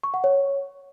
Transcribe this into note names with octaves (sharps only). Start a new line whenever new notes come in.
C#6
F#5
C#5